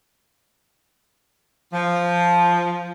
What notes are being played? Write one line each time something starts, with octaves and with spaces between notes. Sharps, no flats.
F3